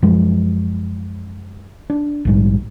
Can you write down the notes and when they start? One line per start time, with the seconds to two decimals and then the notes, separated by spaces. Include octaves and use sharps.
0.02 F#2 F3 G#3
1.90 D4
2.25 A#1 G#2 G3